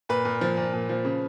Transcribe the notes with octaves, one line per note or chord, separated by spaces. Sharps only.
A#2 B4
A#2
F3
A#2
A#2
F3
C#3